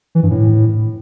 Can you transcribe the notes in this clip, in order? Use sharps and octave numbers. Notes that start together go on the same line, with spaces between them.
E3
G2
A2